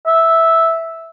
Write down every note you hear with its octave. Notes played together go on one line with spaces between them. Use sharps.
E5